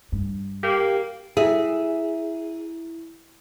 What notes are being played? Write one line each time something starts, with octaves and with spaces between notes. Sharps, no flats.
G2
A#3 G4
E4 G#4 E5